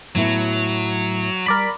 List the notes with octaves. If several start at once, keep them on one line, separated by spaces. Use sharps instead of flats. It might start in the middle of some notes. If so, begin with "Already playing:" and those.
A2 F#3 B3 E4
G3 A#4 D5 B5